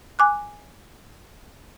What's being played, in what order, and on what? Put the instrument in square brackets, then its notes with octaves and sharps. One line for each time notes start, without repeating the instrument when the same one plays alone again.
[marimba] G#5 D6 F#6